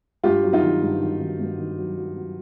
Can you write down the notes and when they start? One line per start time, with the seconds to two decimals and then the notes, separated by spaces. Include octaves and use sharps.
0.24 G2 F4 G4
0.44 F#3
0.53 D#4 F4
0.63 D#3
0.82 G2
1.01 D#3
1.20 D#3
1.40 G2
1.58 D#3
1.78 F#3
1.98 F#3
2.16 F#3